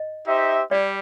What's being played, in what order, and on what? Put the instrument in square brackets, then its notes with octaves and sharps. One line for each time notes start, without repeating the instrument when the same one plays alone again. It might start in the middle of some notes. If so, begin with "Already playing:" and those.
Already playing: [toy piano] D#5
[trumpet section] D#4 G4 C5 E5
[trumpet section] G3 [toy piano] D5